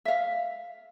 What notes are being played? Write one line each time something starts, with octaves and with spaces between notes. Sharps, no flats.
E5 F5